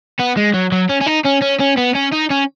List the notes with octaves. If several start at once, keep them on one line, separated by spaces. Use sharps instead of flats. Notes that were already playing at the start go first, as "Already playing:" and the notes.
B3
G#3
F#3
F#3
C#4
C#4
D#4
C#4
C#4
C#4
B3
C#4
D#4
C#4